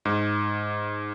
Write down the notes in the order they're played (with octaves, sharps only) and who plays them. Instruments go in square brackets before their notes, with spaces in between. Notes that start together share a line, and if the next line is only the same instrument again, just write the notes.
[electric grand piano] G#2